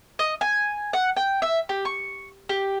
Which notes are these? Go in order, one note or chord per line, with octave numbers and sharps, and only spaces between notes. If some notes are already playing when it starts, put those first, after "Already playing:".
D#5
G#5
F#5
G5
E5
G4
C#6
G4